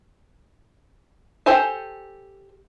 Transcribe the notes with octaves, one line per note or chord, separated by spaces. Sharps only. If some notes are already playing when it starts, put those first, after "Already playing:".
G4 A4 C5 G#5 A5